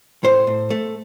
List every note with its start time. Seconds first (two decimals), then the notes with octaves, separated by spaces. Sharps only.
0.24 A2 C5
0.47 A2
0.70 A3